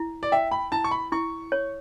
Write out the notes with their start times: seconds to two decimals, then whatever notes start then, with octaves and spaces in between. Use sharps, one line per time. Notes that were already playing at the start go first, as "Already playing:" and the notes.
Already playing: E4
0.23 D5
0.32 E5 G5
0.51 B5
0.72 E4 A5
0.84 C#6
0.91 B5
1.12 E4 C#6
1.52 C#5